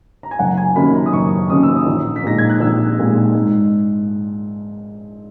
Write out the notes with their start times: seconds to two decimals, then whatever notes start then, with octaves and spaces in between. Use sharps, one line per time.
0.23 A#5
0.31 G#5
0.39 F#1 F#5
0.57 G#5
0.76 F#2 D#3 A#3 C#4 B5
0.95 A#5
1.06 D#6
1.13 F#1 C#6
1.50 F#2 D#3 A#3 C#4 D#6
1.63 E6
1.76 D#6
1.86 A#1
2.16 B6
2.24 A#2 G#3 D#4 A#6
2.38 G#6
2.50 F#6
2.60 A#1 E6
2.98 A#2 G#3 D#4
3.35 G#2